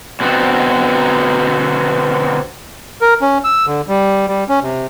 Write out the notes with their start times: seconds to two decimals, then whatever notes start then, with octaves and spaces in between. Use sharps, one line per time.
0.20 B2 D3 B3 C4
3.01 A#4
3.22 C#4
3.44 E6
3.66 D3
3.88 G3
4.28 G3
4.49 C#4
4.63 C3